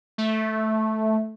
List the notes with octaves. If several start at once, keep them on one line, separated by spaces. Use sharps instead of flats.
A3